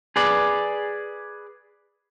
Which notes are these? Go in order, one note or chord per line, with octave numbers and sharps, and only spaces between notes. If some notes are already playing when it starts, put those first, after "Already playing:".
G#4 B4 D5